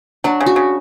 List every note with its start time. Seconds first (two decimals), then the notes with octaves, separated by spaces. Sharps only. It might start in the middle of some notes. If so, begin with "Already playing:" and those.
0.24 F#3 D4
0.40 C#3
0.46 F#4
0.56 C#3